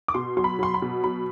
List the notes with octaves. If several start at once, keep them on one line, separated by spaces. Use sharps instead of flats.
D6
B2 C6
F#3 C6
B5
F#3 C6
B5
B2
F#3 B5